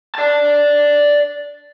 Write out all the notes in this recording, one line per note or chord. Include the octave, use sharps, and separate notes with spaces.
D5 A5